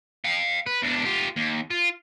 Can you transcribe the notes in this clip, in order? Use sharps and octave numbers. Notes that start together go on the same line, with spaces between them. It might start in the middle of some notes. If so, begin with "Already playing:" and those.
F5 G5
B4
E2 D4
F4 G4
D#2
F4